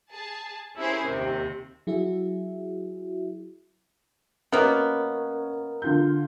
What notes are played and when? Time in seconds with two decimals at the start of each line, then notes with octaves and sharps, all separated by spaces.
0.13 G#4 A5
0.76 C#4 E4 G4 G#4 A#4 C5
1.08 D#2 C3
1.87 F#3 E4 F#4 G#4 E5
4.52 B2 A#3 B3 C#4 A#4
5.82 D3 F4 G6